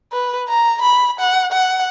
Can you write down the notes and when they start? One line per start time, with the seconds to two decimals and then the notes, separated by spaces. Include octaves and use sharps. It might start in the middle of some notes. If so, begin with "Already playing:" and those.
0.12 B4
0.49 A#5
0.82 B5
1.20 F#5
1.52 F#5